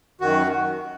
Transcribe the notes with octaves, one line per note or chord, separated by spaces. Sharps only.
F#2 D#3 F#4